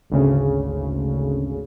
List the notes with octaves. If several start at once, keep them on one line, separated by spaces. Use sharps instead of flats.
G#1 D2 C#3